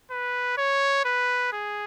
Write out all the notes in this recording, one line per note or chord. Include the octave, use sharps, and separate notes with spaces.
B4
C#5
B4
G#4